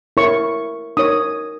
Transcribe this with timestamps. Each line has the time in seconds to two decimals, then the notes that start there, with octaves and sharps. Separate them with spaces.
0.17 E4 A#4 C#5 C#6
0.97 D#4 A#4 C#5 D#6